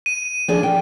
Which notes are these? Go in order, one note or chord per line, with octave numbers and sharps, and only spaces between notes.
D#7
F3 D4 G#4
G5